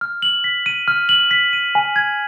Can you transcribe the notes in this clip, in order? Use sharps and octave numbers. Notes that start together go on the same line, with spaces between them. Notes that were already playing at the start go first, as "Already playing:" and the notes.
F6
F#7
B6
D#7
F6
F#7
B6
D#7
G#5
G#6